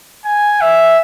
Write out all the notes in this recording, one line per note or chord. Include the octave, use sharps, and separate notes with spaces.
G#5
E5